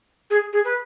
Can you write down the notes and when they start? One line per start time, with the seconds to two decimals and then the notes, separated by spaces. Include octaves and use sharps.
0.30 G#4
0.53 G#4
0.65 B4